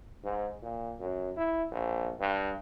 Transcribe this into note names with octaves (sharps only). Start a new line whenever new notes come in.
G#2
A#2
F#2
E4
A#1
G2